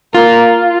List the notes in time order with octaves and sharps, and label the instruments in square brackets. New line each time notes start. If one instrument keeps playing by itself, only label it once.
[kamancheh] A#3 [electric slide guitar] F4